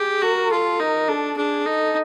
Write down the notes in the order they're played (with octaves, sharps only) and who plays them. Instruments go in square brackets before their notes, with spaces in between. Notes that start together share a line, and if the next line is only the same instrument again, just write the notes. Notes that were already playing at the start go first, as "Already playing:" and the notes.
Already playing: [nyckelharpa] G4 [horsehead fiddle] G#4
[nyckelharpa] F#4 [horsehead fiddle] A#4
[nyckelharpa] F4 [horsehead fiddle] A4
[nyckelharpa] D#4 [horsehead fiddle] A#4
[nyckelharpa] D4 [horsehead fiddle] A4
[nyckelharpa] D4 [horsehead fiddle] G#4
[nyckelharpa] D#4 [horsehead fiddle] A4